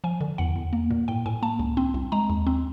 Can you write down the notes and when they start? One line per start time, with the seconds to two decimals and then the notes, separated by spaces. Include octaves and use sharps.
0.04 F3 G#5
0.21 D3
0.38 E2 F#5
0.56 E2
0.73 A#3
0.91 A#2
1.08 A2 G5
1.26 A2 G#5
1.42 A#3 A5
1.59 C#2
1.77 C4
1.94 C2
2.12 G#3 A#5
2.30 D#2
2.47 C4